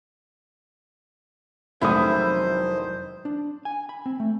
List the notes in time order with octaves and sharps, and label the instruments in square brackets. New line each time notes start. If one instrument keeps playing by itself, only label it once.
[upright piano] F1 D#3 D#6 [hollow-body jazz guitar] F#3 G#3 C#4 [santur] E4 [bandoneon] C5
[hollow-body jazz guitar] D4
G#5
B5
C4
A3